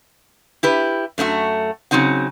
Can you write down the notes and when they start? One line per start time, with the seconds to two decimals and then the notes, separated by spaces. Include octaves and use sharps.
0.63 E4 G4 B4
1.18 F#2 A3 D4 F#4
1.91 C#3 F#3 C4 D#4 F#5